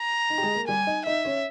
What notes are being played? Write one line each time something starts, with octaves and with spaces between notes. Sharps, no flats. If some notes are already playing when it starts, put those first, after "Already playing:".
Already playing: A#5
D#4
G4
G#3 G#4
A#3 A#4
G3 G4 G#5
D#4 D#5
D#4 D#5 E5
C#4 C#5